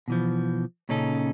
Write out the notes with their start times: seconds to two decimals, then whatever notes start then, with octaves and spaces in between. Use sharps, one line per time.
0.08 B2 E3 F3
0.89 A#2 C#3 C#4 D#4 A4